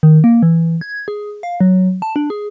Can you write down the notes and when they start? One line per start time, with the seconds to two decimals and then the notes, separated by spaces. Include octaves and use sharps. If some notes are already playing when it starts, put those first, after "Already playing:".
0.03 D#3
0.24 A#3
0.43 E3
0.81 G#6
1.08 G#4
1.43 F5
1.61 F#3
2.02 A5
2.16 D4
2.30 G#4